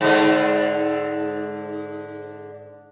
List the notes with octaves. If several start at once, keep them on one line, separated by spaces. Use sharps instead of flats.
G#2 D3